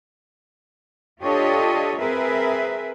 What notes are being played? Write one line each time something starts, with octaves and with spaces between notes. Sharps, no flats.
D4 F4 G4 A4 C#5 D#5
C4 G#4 A#4 B4 E5